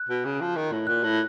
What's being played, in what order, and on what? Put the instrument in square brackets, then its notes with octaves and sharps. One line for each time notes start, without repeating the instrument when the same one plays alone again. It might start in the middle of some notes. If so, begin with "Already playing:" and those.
Already playing: [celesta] F#6
[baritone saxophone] B2
C#3
F3
D#3
A2
[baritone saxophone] A#2 [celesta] F#6
[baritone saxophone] A2